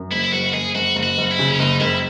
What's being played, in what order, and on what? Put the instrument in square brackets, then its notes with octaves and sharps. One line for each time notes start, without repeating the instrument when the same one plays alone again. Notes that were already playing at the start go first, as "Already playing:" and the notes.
Already playing: [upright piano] F#2
[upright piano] F#1 [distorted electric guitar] E4
[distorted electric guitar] E4
[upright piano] F#1 [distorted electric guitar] F#4
[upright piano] F#1 [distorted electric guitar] G#4
[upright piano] F#1 [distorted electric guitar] F#4
[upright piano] F#1
[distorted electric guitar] F#4
[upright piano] F#1
[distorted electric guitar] E4
[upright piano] C#3
[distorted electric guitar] C#4
[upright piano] F#1 [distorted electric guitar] D#4
[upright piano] F#1 [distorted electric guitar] E4